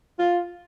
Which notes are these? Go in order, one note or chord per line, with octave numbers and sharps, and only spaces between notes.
F4